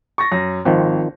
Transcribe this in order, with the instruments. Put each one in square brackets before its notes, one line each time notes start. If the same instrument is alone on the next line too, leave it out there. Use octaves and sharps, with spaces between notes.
[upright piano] C#6 A6 A#6
F#2 A#6
[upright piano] G#1 [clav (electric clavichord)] D#3 F3 C4